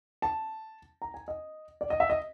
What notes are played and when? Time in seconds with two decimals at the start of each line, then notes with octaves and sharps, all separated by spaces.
0.22 A5
1.02 A#5
1.14 G#5
1.28 D#5
1.81 D5
1.90 D#5
2.00 E5
2.10 D#5